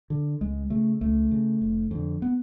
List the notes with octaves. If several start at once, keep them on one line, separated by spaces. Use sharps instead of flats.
D3
C#2 G#3
C#3 A3
C#2 A3
C#3
F1
F2 D3
B3